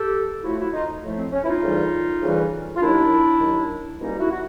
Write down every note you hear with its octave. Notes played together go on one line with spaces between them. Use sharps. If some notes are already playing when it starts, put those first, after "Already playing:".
Already playing: G4 A4
A2 F3 A3 E4 F#4
E4 F#4
D#4 F4
A2 F3 A3
C4
C#4
E4
D#4 F4
D2 C#3 E3 G3
D2 C#3 E3 G3
F4
D#2 D#3 F#3 D4 E4
D#2 D#3 F#3
C2 B2 G3 A#3 C#4 D#4
E4 F#4
F#4